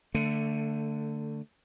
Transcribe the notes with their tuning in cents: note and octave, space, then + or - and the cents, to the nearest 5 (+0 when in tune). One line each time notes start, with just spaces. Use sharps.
D3 +0 A3 +20